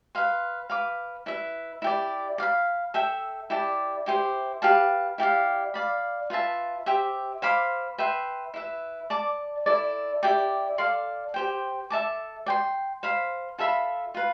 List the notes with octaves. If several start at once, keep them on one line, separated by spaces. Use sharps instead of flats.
B4 F5 C6
B4 F5 B5 D6
E4 B4 E5
E4 G4 D5
D5 F5 B5
A4 E5 G5
E4 G4 D5 A5
E4 G4 C5
G4 B4 F5 A5
E4 G4 D5 F5
D5 F5 B5
F4 B4 E5 A5
G4 C5 E5
C5 F5 B5 D6
B4 E5 G5 C6
E4 B4 E5
D5 A5 D6
E4 A4 D5
E4 G4 D5 G5
A4 D5 F5 C6
G4 C5 G5
A4 E5 A5 D6
D5 G5 C6
C5 F5 B5
F4 A4 E5 B5
F4 B4